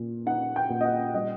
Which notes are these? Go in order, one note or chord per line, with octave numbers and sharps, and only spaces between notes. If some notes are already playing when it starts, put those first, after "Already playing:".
Already playing: A#2
D#4 F#5
G5
A#2
D#5
F#5
G3 D#5